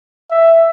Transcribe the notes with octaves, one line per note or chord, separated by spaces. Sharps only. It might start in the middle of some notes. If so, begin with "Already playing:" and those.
E5